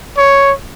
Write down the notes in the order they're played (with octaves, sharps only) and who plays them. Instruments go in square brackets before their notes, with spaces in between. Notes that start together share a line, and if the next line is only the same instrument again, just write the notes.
[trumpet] C#5